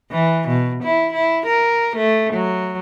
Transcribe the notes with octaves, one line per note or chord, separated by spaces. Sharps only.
E3
B2
E4
E4
A#4
A3
F#3